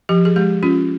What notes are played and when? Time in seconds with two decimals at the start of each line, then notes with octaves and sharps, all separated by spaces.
0.09 F3 G4
0.25 G#4
0.36 G#3 G4
0.63 C#4 F4